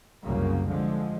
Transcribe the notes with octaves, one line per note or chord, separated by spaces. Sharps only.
C2 F#2 C#3 A#3
D3 F3 G#3